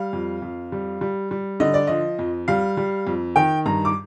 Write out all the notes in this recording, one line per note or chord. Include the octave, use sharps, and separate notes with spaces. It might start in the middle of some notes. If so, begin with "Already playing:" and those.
Already playing: G3 F5
F2
F2
G3
G3
G3
D3 D#5
D5
F3 D#5
F2
G3 F5
G3
F2
D#3 G5
G2 A#5
D6